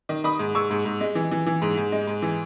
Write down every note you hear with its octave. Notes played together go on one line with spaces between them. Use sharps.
D#3
D#3 B5 D#6
G#2
G#2 C#6 E6
G#2
G#2
G#3
E3
E3
E3
G#2
G#2
G#3
G#2
E3